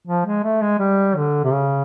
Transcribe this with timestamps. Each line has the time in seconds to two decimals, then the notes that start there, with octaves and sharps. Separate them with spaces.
0.08 F3
0.26 G#3
0.44 A3
0.62 G#3
0.79 G3
1.16 D3
1.44 C3
1.52 C#3